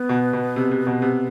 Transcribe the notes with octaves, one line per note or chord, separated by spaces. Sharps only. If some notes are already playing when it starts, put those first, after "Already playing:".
Already playing: B3
B2
B2
C3
C3
B2
C3